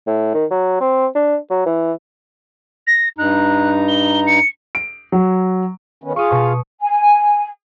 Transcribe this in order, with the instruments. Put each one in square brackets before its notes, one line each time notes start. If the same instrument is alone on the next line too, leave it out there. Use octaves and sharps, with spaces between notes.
[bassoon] A2
D#3
F#3
C4
D4
F#3
E3
[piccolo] A#6
[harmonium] G2 D#4 A#5 [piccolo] F#6
[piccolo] G7
C#7
[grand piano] D7
F#3
[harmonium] D#3 B3 C#4
[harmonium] F4 G#4 F5 [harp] C#6 D#6
[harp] B2 C#6
[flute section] G#5